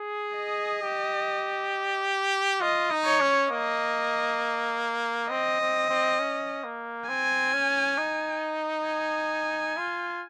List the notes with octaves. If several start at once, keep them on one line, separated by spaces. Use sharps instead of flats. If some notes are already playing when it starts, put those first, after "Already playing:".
Already playing: G#4
D#5
G4
F4 D#5
D#4
C#5
C#4
A#3 D#5
C4 D#5
C4
C4
C#4
A#3
C4 G#5
C#4
D#4
G#5
F4